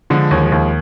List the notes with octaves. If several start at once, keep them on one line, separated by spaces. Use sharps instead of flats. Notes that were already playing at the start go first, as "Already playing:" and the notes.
D3 F3 G#3
D#2
F3 G#3
D#2